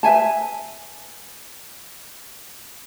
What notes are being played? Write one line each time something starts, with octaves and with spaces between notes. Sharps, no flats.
B4 E5 G#5 A5